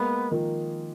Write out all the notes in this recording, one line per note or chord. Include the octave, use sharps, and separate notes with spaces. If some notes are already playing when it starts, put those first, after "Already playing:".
Already playing: G#3 A#3 B3
D#3 F3